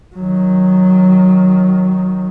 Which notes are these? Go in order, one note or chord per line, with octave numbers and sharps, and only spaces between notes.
D#3 F#3